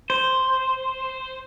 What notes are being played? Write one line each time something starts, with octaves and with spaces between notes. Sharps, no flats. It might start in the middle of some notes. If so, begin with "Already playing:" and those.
C5